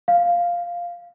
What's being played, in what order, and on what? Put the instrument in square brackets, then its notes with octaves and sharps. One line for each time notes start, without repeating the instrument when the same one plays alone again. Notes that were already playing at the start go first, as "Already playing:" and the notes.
[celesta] F5